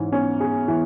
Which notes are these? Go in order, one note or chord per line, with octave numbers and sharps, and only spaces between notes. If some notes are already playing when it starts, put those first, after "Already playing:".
Already playing: G#2 E3 C#4
B3 C#4
G#4
E3